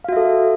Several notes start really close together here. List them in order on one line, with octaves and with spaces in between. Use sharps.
F5 F#4 E5 A4